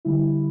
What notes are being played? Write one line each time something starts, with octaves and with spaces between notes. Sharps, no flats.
D3 G3 E4